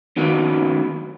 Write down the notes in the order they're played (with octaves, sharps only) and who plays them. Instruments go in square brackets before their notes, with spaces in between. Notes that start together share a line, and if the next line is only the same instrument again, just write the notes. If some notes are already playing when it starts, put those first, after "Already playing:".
[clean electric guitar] F#2 D#3 F#3 A#3 B3 C#4